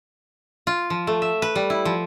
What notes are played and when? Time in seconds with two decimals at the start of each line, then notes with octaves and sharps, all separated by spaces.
0.67 F4
0.90 F3
1.07 A3
1.22 E5
1.42 B4
1.55 G3
1.70 E4
1.85 F3